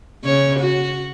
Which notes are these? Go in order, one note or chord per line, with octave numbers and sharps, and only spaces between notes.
C#3 C#5
F#4